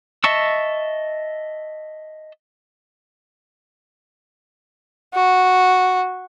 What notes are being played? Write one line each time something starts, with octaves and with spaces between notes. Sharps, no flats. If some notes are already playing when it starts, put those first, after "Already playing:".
D#5 E5 A5 C#6 E6
F#4